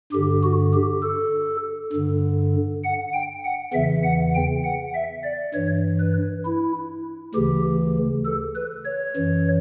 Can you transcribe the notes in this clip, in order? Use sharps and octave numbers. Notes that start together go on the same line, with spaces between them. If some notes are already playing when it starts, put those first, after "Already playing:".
G2 D3 G4
F#4
G4
A4
G2 D3
F#5
G5
F#5
E2 C#3 E3 E5
F#5
G5
F#5
E5
D5
G2 E3 C#5
B4
E4
D2 C#3 E3 G4
A4
B4
C#5
F#2 E3